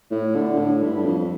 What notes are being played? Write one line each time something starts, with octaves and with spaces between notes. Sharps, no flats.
A2
D3
A2
G2
G2
F2